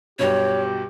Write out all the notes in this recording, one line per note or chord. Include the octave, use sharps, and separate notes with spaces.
B1 G2 B2 G4 C#5